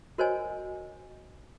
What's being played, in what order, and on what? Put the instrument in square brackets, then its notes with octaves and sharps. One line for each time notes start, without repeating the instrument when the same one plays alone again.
[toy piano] F#4 A#4 C5 C#5 D#5 G#5